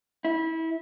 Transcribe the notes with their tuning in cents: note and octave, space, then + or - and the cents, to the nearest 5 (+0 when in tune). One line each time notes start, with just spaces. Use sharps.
E4 -25